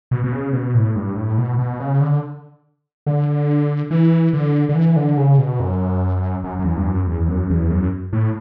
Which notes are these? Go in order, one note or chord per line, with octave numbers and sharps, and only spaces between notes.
B2
B2
C#3
B2
A2
G2
A2
B2
B2
C#3
D3
D3
E3
D3
D3
E3
D3
C#3
B2
F#2
F#2
F#2
E2
G2
F#2
E2
F#2
E2
F#2
A2